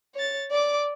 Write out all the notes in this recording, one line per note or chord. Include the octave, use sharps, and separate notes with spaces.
C#5 A6
D5 D6